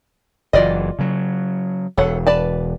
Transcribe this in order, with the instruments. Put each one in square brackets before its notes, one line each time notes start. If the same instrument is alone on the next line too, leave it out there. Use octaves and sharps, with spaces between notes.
[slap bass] F#1 E3 [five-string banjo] F4 D5 D#5
[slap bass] C#3 F#3
[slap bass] E1 [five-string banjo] A4 C#5 F#5
[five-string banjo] B4 D5 A5